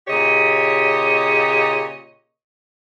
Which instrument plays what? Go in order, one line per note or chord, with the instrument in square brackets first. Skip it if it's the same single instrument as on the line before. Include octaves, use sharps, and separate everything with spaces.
[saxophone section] A#2 C#3 G4 C#5 D#5